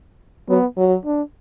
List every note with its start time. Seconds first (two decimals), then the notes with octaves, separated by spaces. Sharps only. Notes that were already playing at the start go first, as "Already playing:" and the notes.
0.49 F#3 B3
0.77 F#3
1.05 D4